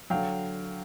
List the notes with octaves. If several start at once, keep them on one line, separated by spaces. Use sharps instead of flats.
D3 F#3 F5 G5